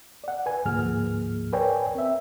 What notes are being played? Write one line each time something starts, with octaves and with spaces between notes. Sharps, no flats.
D5 F#5
B4 G#5
D2 G#2 F3 A#3 G#4 F6
A#4 B4 C#5 D5 G5 G#5
C4 E5